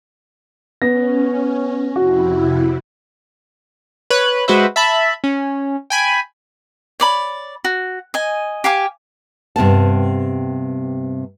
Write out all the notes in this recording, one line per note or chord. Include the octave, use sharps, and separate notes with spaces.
B3 C#4 A#6
F2 C3 E4 F#4
B4 C#5 F#6
G#3 F#4 B4 C5 E5
E5 A5 B5
C#4
G5 G#5 B5
C#5 D5 B5
F#4
D#5 G#5
G4 F5 G#5 D6
G2 C3 B3 A5